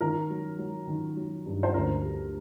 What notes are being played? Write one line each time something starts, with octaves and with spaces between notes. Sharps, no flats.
D#3 A#4
F#3
F#3
D#3
F#3
G2
C5
D2 A#4
G3